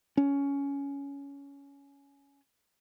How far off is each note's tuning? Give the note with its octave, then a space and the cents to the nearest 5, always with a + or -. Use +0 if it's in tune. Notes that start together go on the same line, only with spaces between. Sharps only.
C#4 +15